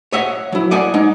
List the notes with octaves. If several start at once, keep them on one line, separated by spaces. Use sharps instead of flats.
C#5 D#5 E5 F#5
F#3 E4
D5 D#5 F#5 G#5
G#3 D#4